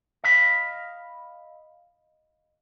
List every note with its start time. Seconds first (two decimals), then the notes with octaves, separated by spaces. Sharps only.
0.24 D#5 F5 B5